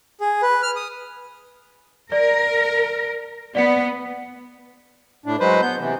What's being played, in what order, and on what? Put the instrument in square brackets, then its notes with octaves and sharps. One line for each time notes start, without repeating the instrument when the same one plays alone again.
[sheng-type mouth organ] G#4
B4
F6
D#6
[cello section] A#4 [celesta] D5
[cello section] B3 [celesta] D5 F#5 C#7
[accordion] A2 D4
F#3 G#3 B4 C5
B3 G6
C3 E3